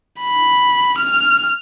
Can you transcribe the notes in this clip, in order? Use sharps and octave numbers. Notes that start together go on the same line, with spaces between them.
B5
F6